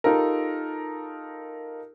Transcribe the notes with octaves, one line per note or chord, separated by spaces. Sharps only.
D#4 F4 G4 A4 A#4